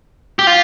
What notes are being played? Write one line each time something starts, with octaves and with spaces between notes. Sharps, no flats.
G4
F4